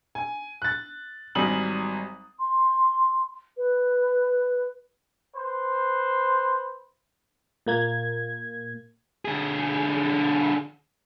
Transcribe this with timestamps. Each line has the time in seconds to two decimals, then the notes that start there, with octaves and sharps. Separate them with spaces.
0.15 G#5
0.62 F#6 A6
1.35 G#1 F#3 G3 G#5 D#6 F#7
2.39 C6
3.57 B4
5.35 B4 C5
7.66 A#2 A#3 G#6
9.25 D3 G#4